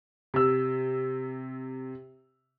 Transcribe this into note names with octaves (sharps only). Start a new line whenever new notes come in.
C3 E6